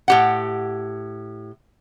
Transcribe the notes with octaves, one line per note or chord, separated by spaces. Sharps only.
A2 G4 F#5